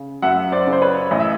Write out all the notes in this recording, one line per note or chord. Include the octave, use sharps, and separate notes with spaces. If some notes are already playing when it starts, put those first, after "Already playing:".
Already playing: C#3
F#2 E5 F#5
C5 D5
C#3
C5
B4 C#5
A1 D#5
E5